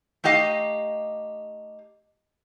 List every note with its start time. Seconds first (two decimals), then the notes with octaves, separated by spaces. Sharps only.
0.24 A3 D#4 G4 D#5 F5